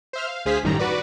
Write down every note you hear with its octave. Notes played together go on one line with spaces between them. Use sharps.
C5 E5 F6
F5
D2 G#4 C5 F5 B6
A1 F#2 D#3 G3 A#5
F#4 B4 D5